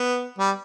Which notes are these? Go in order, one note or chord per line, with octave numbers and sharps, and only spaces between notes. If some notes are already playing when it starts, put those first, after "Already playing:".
Already playing: B3
G3